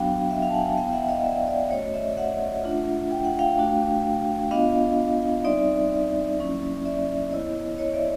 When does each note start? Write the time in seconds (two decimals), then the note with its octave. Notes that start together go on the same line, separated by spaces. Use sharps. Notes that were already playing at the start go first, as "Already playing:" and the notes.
Already playing: F#3 B3 D4 F#4 F5 G5
0.31 E5 F#5
0.42 F5 G5
0.49 A5
0.54 F#5 G#5
0.65 G5 A5
0.77 B3 E4 F5 G5
0.93 E5 F#5
1.09 D#5 F5
1.24 D5 E5
1.47 D5 E5
1.71 A3 C#4 F#4 C#5 D#5
1.94 D5 E5
2.17 E5 F#5
2.64 A3 D4 F4
3.11 G5
3.25 F#5
3.39 F5 G5
3.58 A3 D4 F#4
4.51 B3 D4 F4 D#5 F5
5.44 G3 C4 D#4 D5 E5
6.38 F#3 A#3 C#4 E4
6.85 D5 E5
7.31 B3 E4 C#5 D#5
7.78 C#5 D#5
7.94 D5 E5